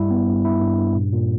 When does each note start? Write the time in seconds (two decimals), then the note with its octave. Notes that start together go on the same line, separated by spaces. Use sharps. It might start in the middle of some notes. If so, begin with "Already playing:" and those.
Already playing: G2 G3 E4
0.11 B3
0.27 G2
0.45 E4
0.61 G2
0.78 G2
0.96 A#2
1.13 A#2